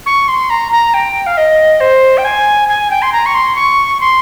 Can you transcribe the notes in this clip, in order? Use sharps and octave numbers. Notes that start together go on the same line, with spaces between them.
C#6
C6
A#5
A#5
G5
F5
D#5
C5
G5
G#5
G#5
G5
C6
A#5
C#6
C6
C#6
C6